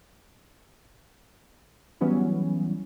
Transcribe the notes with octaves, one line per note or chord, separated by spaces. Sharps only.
E3 F#3 G3 B3 C#4 E4